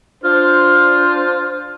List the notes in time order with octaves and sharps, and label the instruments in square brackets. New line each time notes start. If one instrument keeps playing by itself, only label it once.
[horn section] D4 F4 C5